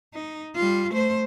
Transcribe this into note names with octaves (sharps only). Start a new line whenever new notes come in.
D#4
G3 F4
A3 C5